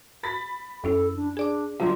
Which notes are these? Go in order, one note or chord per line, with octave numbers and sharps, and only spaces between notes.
B5 A6 B6
F#2 C#4 E4 A4
D4
D4 G#4 D5 D6
G1 F#3 F4